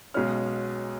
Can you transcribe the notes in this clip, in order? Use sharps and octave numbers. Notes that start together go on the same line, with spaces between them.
B1 B2 G#3 C#4 F6